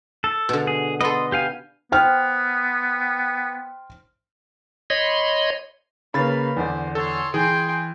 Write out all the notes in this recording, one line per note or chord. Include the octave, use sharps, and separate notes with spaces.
A4
B2 D3
G#4
B3 A4 D#5 C6
G4 F5 G#5
B3 C5 G5 F6
C#5 D#5 B5 C6
C#3 A#3 B4 F5 B5 A6
E2 D3 C5 D5
A4 C#5 C6
E3 G#4 G5 C6